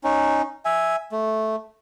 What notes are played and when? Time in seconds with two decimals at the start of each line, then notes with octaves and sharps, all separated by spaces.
0.04 C#4 D#4
0.65 E5 G#5
1.12 A3